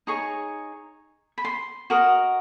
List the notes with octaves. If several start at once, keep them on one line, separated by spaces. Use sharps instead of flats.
D#4 G#4 C#5 C#6
B5
C6
F#4 A#4 D#5